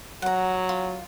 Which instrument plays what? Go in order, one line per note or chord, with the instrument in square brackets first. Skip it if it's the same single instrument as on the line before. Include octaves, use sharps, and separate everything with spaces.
[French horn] F#3 [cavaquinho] F#5 A#5
[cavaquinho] F4